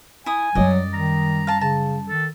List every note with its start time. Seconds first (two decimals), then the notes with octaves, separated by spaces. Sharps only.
0.26 E4 G#5 D#6
0.55 F#2 F#3 G3 D5 D#5
0.94 D#3 A#5
1.47 F5 A5
1.61 C#3 A5
2.09 D#3 A4